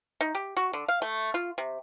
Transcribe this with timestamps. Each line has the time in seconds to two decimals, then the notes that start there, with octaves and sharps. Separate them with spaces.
0.21 D#4
0.35 G4
0.57 F#4
0.73 D3
0.88 F5
1.02 A3
1.34 F4
1.58 C3